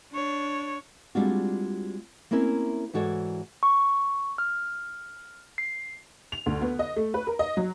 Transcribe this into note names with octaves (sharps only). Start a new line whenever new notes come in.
D4 C#5
G3 G#3 C4 D4 F4 F#4
A#3 C4 C#4 E4 A#4
G#2 E3 F#4 A4 C#5 D5
C#6
F6
C7
F7
D2
B3
D#5
A3
B4
A#4
D#5
F#3